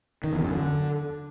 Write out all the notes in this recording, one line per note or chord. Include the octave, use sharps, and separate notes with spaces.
D#3
E2
F#2
D3